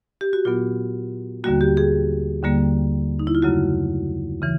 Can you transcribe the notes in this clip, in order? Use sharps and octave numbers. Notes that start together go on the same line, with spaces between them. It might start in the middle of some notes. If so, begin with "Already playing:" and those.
G4
F#4
A#2 F#3 B3 F4
D#2 D3 G3 A#3 F#4
G4
G#4
D#2 D3 G3 A#3
D#4
E4
F4
F#2 C#3 F#3 A3 F#4
C#3 E3